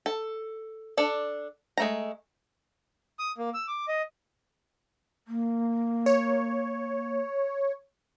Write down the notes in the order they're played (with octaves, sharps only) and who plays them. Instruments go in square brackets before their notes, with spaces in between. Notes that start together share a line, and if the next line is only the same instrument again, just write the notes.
[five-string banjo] A4
D4 A4 D5
G#3 A3 A#5
[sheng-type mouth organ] D#6
A#3
E6
D6
D#5
[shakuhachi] A#3
[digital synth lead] C#5